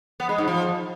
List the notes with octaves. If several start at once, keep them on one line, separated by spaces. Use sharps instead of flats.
B3
G#3
G#2
F3